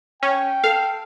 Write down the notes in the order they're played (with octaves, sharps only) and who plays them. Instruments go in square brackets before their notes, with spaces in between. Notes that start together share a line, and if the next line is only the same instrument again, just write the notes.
[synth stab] C#4 [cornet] G5
[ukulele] A4 [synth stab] F5